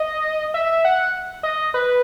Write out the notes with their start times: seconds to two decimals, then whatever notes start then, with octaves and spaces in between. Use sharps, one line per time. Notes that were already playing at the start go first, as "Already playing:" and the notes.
Already playing: D#5
0.54 E5
0.85 F#5
1.43 D#5
1.74 B4